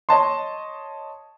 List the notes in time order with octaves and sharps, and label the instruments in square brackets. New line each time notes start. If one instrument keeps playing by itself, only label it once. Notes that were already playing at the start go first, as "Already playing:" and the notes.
[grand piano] C#5 D#5 A5 C6